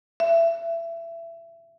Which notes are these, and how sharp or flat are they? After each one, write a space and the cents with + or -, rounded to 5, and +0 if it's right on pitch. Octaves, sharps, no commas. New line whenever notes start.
E5 +25